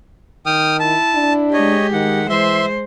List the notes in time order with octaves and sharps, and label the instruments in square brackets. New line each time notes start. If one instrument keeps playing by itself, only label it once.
[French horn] D#3 [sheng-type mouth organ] G5 D#6 F6
[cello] E4 [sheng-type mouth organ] A5
[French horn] D4
[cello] G#3 G4 [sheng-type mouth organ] C#5 D#5
[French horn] D#3 [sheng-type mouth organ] F#5
[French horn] E3 [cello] G#3 C5 [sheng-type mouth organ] E5 C6